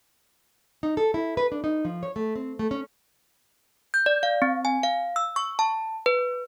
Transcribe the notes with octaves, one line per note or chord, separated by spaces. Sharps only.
D#4
A4
E4
B4
D4
D#4
F3
C#5
A3
C4
A3
C#4
G6
D5
F5
C4
G#5
F5
E6
C#6
A5
B4